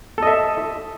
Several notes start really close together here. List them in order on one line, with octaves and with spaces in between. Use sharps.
A4 D#5 E5